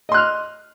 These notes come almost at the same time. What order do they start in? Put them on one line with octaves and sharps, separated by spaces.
D#5 C6 F#6 F6